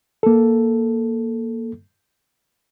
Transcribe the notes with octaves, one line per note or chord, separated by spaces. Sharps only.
A#3 A4